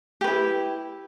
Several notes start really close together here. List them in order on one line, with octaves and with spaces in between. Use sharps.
G4 B4 E4